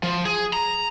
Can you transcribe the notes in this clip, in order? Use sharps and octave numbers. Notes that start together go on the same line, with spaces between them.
F3
G#4
A#5